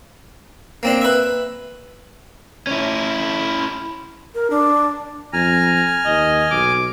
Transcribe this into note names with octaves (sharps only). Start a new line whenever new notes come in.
A#3 C4 D4
B4 E5
C#4 E4
A#4
D4
F2 G#5 A#5 F6
D#2 D#5
B1 D6